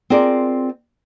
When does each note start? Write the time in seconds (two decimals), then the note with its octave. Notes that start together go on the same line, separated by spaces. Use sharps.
0.10 C4 F4 G#4 A#4 D5